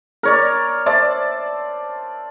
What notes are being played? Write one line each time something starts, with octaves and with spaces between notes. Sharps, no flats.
A#4 C#5 D5
C5 D5 E5 A5